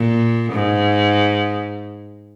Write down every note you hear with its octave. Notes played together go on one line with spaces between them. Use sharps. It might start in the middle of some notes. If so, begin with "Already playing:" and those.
Already playing: A#2
G#2